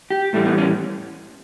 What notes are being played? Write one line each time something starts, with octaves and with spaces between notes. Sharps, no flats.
G4
A2 E3 G3 A3
B3
C#4